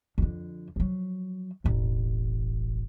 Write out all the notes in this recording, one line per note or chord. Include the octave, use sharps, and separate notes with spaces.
F2 D3
F3 F#3
E1 A1